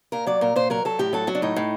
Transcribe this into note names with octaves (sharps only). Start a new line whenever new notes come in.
A#2 A#4
F#3 D5
A#2 A#4
A#2 C5
F#3 A#4
F#3 A4
A2 G4
F#3 A4
F#3 F#4
D4
A2 D#4
A2